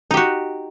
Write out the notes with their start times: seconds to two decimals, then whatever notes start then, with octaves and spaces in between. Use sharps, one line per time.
0.11 D#4
0.14 G4
0.17 F#4